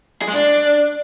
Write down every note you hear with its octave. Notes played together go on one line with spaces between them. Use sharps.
G#4
G#3
D4